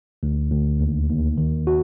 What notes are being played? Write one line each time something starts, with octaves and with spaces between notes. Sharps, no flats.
D2
D2
D#2
D#2
D#3
F#4